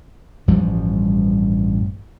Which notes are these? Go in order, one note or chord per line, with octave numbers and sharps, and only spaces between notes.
A1 G2 F3 G3